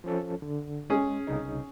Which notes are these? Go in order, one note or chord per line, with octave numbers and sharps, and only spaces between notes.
F3 C#4 A4
D3
G#3 C#4 G#4
C2 C#3 D#4